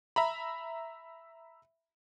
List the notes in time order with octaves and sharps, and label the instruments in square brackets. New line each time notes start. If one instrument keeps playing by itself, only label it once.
[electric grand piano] E5 A#5 B5